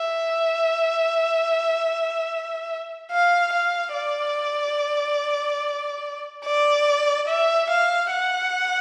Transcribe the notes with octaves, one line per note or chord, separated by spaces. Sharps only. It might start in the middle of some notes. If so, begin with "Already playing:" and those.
Already playing: E5
F5
F5
D5
D5
E5
F5
F#5